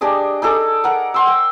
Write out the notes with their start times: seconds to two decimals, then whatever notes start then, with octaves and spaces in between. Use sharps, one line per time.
0.01 D4 G4 G#4 D#5
0.42 D#4 G#4 A4 D5
0.84 A#4 F#5
1.14 F#5 C6 E6
1.27 G5